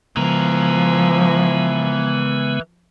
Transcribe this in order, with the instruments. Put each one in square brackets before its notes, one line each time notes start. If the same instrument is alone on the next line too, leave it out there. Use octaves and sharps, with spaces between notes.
[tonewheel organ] C#3 G#3 B3 [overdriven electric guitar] E3 A#4 [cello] F3